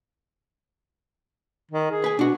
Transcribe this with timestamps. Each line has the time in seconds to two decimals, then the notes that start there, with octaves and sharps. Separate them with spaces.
1.71 D#3
1.91 G#4
2.04 B4 G#5
2.19 B2 D4 F#4